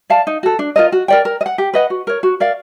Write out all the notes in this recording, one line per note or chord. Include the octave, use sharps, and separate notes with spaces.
D5 F5 A5
D#4
F#4 A4
D4
F4 A#4 D#5
F#4
A#4 D5 G5
A#4
D#5
F#5
G4
B4 D#5 F#5
F#4
A#4 C#5
F#4
A#4 D5 F5